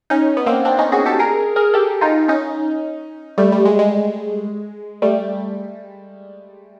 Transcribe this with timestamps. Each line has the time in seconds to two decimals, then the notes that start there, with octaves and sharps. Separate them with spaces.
0.10 C#4 D#4
0.37 B3
0.47 A#3 C4
0.65 C4 D4
0.79 C#4 D#4
0.92 F#4 G#4
1.06 G4 A4
1.19 G#4 A#4
1.56 G#4 A#4
1.74 G4 A4
2.01 D#4 F4
2.28 C#4 D#4
3.38 G3 A3
3.52 G3
3.65 G#3
3.79 G#3
5.02 G3 A3